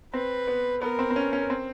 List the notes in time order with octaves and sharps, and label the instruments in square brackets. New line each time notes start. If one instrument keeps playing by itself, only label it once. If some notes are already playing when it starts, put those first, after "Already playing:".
[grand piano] C4 [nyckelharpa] B4
[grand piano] B3
[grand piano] B3 [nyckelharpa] A#4
[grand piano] C4
C4
C#4
C#4
C4